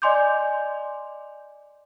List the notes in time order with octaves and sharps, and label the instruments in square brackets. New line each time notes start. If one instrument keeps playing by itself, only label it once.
[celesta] D5 D#5 G#5 C6 D6 G6